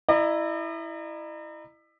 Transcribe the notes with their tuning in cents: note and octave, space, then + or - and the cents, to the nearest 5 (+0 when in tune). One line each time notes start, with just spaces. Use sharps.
E4 +0 D#5 -45 A#5 +0